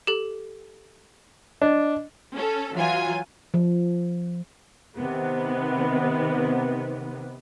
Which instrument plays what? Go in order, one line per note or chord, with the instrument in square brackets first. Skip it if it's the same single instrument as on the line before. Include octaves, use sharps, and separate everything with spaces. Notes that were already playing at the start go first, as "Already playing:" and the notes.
[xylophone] G4 A4
[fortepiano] D4 [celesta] D#5
[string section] C#4 A4
E3 F#3 F4 G#5
[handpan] F3
[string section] C3 D#3 B3